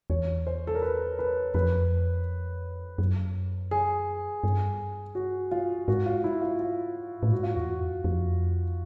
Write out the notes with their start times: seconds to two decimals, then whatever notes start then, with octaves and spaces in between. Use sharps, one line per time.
0.10 E2 C#5
0.47 C5
0.67 A4
0.75 A#4
0.82 B4
1.19 B4
1.54 F2 B4
2.98 F#2
3.71 G#4
4.44 G2
5.15 F#4
5.52 F4
5.88 G#2 F#4
6.06 F4
6.24 E4
6.41 F4
6.59 F4
7.23 A2
7.32 G#2 F#4
7.43 F4
7.55 E2 F#4
7.80 F2
8.04 F2